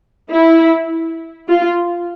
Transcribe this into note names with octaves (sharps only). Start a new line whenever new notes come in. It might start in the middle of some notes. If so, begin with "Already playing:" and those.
E4
F4